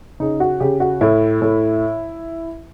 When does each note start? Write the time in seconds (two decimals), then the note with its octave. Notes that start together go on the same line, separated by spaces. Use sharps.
0.20 C#3 D#4
0.40 F#4
0.60 C#3 G4
0.80 F#4
1.01 A2 E4
1.42 A2